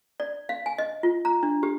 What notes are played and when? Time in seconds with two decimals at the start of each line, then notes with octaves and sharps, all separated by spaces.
0.20 D5
0.49 F5
0.66 G#5
0.78 D#5
1.03 F4
1.25 A#5
1.43 D4
1.63 G4